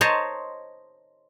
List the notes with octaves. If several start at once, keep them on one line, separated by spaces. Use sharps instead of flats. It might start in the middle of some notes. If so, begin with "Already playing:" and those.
C5 C#5 D#5 A5 A#5